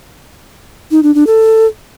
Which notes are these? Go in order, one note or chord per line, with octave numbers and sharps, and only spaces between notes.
D#4
D4
D4
A4